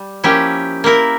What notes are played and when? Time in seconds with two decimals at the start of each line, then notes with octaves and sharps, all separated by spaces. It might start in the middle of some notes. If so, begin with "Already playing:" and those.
Already playing: G3
0.24 F3 A#3 C#4 E4 G4
0.84 A#3 E4 A#4